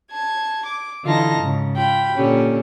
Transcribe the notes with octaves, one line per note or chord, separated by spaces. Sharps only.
A5 G#6
D6
D3 E3 D#4 F4 A5 A#6
G#2 C#3
F4 G5 B5
A#2 D3 C#4 G4